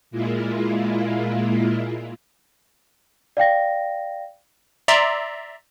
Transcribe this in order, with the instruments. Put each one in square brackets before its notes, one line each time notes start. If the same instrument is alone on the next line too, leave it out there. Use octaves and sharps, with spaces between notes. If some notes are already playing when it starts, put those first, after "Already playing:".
[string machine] A#2 G#3 A#3 E4 F4
[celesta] D5 F5 G5 A#6
[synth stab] D5 E5 A#5 C6